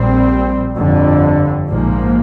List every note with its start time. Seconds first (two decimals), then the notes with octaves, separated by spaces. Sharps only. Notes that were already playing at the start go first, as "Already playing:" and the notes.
Already playing: A#1 A#2 G3 C4
0.76 G1 F2 D3 F3
1.68 A#1 G#2 F3 A#3